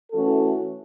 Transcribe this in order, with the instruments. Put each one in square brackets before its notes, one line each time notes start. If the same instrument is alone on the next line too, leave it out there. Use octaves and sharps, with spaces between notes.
[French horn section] E3 A3 C#4 F#4 A4